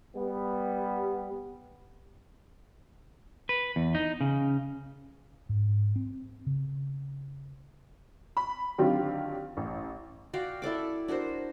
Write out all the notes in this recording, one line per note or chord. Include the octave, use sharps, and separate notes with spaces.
G3 B3
B4
E2
D#4
C#3
G#2
C4
C#3
B5
D3 D#3 F#3 C4 F4 G4
A1
F#4 D5 F5 G5
E4 A4 D5 D6
D4 F#4 A#4 C5